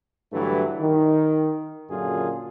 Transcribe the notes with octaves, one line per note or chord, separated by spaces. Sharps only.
G2 D3 E3 F#3 A3
D#3
F#2 A#2 D3 F4 G#4